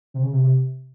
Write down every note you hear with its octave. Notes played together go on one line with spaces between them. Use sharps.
C3
C#3
C3
C3